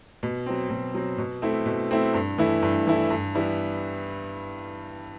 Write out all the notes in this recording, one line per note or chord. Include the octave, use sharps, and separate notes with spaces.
B2
F#3 C4
B2
F#3 C4
B2
A3 C4 E4
B2
A3 C4 E4
G2
E3 A3 E4
G2
E3 A3 E4
G2
E3 G3 B3 E4